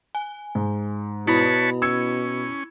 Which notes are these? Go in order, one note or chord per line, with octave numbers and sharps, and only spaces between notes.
G#5
G#2
B2 E4 B4 C#5 A5 B5
C#4 E6 G#6 C#7